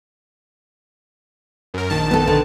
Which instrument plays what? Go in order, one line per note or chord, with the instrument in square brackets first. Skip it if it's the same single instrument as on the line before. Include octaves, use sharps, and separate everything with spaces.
[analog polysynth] F#2 A#4
A#1 D#3 A5
[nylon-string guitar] B3 A4
D3